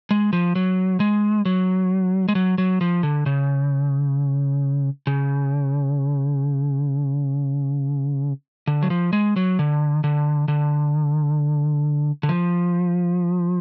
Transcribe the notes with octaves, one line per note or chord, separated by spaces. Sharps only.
G#3
F3
F#3
G#3
F#3
G#3
F#3
F#3
F3
D3
C#3
C#3
D3
F#3
F3
G#3
F#3
D3
D3
D3
D3
F3